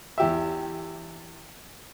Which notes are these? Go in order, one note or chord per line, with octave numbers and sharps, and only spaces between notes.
E2 G4 E5